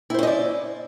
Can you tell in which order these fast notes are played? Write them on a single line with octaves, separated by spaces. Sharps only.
E4 C5 C#4 D#5 D5